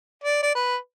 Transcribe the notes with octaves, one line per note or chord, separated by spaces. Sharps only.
D5
D5
B4